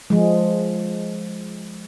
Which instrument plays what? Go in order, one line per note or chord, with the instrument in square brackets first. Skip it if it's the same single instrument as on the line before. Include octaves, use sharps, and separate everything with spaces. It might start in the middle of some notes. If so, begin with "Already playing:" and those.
[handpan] F3 G#3